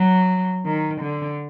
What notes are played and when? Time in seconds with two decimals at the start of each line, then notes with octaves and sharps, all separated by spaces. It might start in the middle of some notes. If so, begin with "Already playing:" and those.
Already playing: F#3
0.65 D#3
1.01 D3